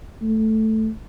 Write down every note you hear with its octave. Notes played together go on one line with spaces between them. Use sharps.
A3